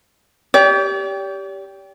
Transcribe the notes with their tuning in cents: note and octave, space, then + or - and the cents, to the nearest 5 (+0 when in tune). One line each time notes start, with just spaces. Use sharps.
G4 +0 D5 -45